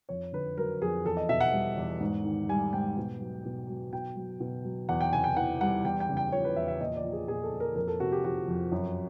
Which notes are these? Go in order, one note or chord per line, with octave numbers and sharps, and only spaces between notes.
F2 C#5
D3 B4
F#3 A#4
F2 G#4
E2 A4
D#5
B2 E5
F#5
G3
E2
G#2
D#3
G3 G#5
G#2 G5
B2
F#3
B2
F#3
B2 G5
F#3
B2
F#3
E2 F#5
G5
C3 G#5
G5
E3 F#5
G3 F#5
E2 G5
G5
C#3
G5
F3 C#5
B4
E2 E5
E5
A#2 D#5
D5
F3
G#4
A#2 G#4
A4
F3
A#4
F2 A#4
A4
C3 F#4
G4
F3 F#4
F2
F#2